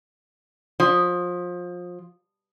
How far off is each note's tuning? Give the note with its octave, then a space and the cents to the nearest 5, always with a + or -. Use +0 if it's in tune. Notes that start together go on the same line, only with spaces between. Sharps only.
F3 +25